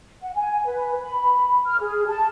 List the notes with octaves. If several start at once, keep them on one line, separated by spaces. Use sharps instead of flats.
F#5
G#5
B4
B5
F6
G#4
A5